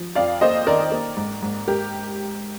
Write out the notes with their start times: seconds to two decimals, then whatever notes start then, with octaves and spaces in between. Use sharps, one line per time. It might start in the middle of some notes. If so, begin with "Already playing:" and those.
Already playing: F3
0.15 F2 D5 F5
0.41 A#3 C5 D#5
0.67 D#3 A#4 D5
0.92 A#3
1.16 G#2
1.42 G#2
1.67 G#2 G4 A#4